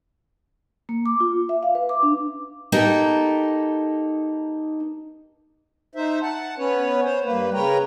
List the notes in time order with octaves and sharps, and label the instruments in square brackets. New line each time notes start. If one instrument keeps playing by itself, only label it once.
[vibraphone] A#3
D6
F4
E5
F5
B4
D6
D4
[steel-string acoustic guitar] A#3 D#4 G4 A4
[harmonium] D#4 C5 E5
F#5 A5
B3 C#4 B4 C#5
C5 C#5
G2 A#3 B4
C#3 A#4 B4 C#5 G5 A#5